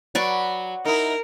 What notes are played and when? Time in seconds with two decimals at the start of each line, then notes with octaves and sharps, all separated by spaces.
0.15 F#3 B4 D5 C#6
0.85 D#4 E4 A#4